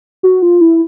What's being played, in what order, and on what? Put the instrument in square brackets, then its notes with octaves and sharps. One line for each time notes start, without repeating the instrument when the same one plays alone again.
[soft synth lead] F#4
F4
E4